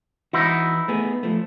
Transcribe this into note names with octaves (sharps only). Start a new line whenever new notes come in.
E3 D#4 E4 F#4
A3 B3 G#4
F3 A3